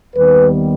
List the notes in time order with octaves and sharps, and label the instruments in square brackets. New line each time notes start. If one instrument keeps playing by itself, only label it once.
[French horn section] D#2 D#3 G3 B3 B4